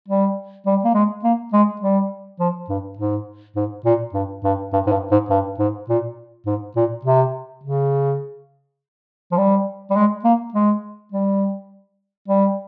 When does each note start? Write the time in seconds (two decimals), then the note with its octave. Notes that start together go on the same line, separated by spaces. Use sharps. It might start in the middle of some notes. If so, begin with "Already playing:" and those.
0.08 G3
0.66 G3
0.84 A#3
0.94 G#3
1.24 A#3
1.53 G#3
1.81 G3
2.40 F3
2.69 G2
2.98 G#2
3.56 G#2
3.85 A#2
4.14 G2
4.44 G2
4.73 G2
4.87 G#2
4.92 G2
5.11 G#2
5.30 G2
5.59 G#2
5.89 A#2
6.46 G#2
6.76 A#2
7.05 C3
7.63 C#3
9.31 F3
9.38 G3
9.90 G3
9.96 G#3
10.24 A#3
10.54 G#3
11.12 G3
12.28 G3